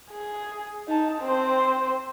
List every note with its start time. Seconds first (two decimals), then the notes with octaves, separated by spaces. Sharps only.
0.10 G#4
0.88 D#4 A5
1.22 C4 C5